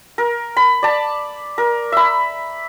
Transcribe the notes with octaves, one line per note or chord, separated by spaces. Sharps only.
A#4
B5
D5 A5
A#4
E5 B5